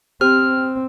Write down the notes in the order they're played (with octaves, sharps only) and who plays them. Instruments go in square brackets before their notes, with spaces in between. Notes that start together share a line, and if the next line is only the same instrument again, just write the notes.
[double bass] C4 [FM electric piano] G4 C5 G5 [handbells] F6